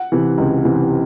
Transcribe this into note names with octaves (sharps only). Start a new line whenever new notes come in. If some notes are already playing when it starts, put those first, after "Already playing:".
Already playing: F#5
C3 E3
C#2
C3 E3